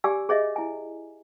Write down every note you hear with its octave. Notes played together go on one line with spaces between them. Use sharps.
G4 D5 G#5 D6 E6
G#4 C#5 D#5 E5
E4 G#5